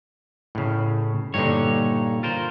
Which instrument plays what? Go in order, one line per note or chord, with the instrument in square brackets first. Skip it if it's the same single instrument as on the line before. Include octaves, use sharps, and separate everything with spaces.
[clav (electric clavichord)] A2 C#3
[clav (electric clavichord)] G2 D3 [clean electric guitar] A#2 D#4 C#5
[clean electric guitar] F4 A#4 C5